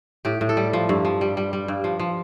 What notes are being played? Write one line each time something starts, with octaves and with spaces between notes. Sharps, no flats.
A2 G4
A2
A4
G3
F3
G2
F3
G3
G3
G3
G2
F3
F3